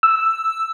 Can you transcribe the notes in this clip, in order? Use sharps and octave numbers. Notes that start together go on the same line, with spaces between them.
E6